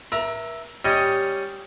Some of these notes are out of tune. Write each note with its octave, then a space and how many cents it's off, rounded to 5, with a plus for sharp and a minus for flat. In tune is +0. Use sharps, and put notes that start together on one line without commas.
A#4 +40 E5 +0 A#5 -20
G3 +0 C#4 +0 D#5 +10